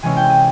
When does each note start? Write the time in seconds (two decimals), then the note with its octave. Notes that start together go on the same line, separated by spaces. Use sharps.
0.02 C3 E3 G#3 C#4 G#5
0.17 G5
0.30 G#5